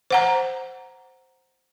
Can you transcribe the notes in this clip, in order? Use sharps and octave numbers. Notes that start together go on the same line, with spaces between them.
C5 F#5 A#5